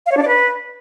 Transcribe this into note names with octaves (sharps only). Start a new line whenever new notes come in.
F5
C#5
D4
D5
B4